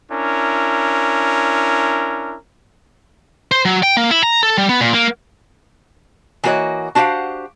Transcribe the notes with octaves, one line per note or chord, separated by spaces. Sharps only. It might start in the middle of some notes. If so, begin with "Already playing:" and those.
C#4 D4 E4 A#4
C5
F#3
G5
A#3
E4
A#5
A4
G3
B3
A#2
A#3
E3 A#3 F#4 G#4 C#5 D#5
D4 F#4 G4 C5 F5 F#5